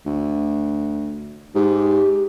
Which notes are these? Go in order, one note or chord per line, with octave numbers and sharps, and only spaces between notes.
D2
G#2 G4